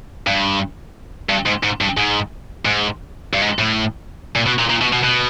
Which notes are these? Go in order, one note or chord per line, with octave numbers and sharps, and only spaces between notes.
G2
G2
G#2
G#2
G2
G#2
G#2
G2
G#2
A2
A#2
B2
A#2
A#2
B2
B2
B2